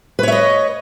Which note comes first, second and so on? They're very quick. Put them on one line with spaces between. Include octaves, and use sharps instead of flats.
B4 C#5 E5 D#5